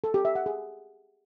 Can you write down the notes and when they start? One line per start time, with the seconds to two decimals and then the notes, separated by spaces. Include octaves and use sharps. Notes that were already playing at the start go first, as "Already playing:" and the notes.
0.04 A4
0.14 G4
0.25 E5
0.35 F#5
0.46 G#4